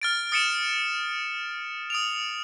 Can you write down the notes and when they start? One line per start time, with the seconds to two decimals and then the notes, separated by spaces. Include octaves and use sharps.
0.02 F6 A6 D7
0.32 D#6 A6 C#7 D7 E7
1.90 D#6 D7 F7